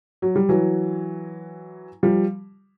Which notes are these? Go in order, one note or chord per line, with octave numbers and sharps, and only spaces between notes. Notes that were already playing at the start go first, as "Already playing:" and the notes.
F#3
G3
E3 F#3
F3 G3